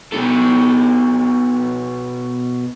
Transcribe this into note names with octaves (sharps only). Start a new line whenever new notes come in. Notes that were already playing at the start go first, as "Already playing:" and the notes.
B2 A4